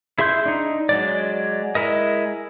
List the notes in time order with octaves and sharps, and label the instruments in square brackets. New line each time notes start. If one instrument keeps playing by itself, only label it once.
[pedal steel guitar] E4 G#4 E5 C6 G6
D4 D#4
F#3 G#3 D5
G#3 E4 A#4 D#5